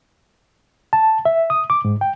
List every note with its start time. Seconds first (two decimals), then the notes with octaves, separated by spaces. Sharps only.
0.93 A5
1.25 E5
1.50 D#6
1.70 D6
1.85 G#2
2.01 G5